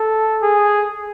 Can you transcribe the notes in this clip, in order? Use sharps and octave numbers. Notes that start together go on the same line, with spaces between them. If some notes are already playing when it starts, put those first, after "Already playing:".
Already playing: A4
G#4